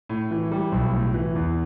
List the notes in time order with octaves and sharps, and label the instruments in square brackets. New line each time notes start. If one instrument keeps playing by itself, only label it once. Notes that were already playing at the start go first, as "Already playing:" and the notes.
[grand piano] A2
E3
G3
B1
A2
E3
E2